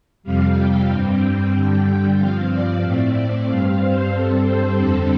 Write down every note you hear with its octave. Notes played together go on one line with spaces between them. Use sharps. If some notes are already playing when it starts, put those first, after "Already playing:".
F2 C3 G3 F5
G5
G2 G3 C4
G5
G2 D3 G3
G2 F3 C4 F5
D5
A2 A3 C4
D5
G2 G3 C4 F5
C5
G2 G3 C4 A4
C5
F2 D3 G3 C4 A4